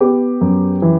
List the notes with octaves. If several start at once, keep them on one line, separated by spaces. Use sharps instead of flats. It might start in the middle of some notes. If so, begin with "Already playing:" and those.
B3 G4
F#2
E3